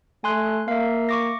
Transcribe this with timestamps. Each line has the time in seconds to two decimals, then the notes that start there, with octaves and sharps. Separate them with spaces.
0.24 A3 G#5 C6 F#6
0.68 A#3 E5 F5
1.09 C#6 D6 A#6